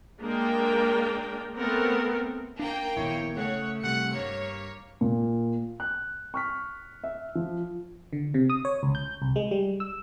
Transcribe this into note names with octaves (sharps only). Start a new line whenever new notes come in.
G#3 A#3 D4 A#4 G5
A3 B3 C4 A4 A#4
A#3 D4 G5
A#1 D#2 B3 E4 C#5
C#3 A3 C#5 F#5
C3 G3 F#5 C#7
G2 A#3 C#5
A#2
F#6
C#6 F6 B6
E5
F3
D3
C3
D#6
C#5
C#2
G6
C2
G#3
G3
E6